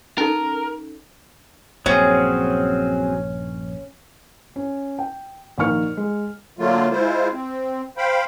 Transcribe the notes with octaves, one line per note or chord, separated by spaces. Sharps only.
C#4 D#4 A4 A#4
A#1 G2 F#3 C4 C#4 G#4
C#4
G5
A#1 D#3 A#4 C#6 F6 C#7
G#3
D3 F#3 A3 A#3 F4
G#3 E4 F4 C5
C4
C5 F5 G5 B5